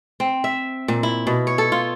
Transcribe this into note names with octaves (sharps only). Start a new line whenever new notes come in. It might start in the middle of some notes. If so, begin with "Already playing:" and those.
C4
E5
A#2
E4
B2
C#5
A4
F4